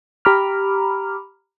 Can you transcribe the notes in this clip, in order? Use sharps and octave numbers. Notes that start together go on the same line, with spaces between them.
G4 A#5 B5 D6 F6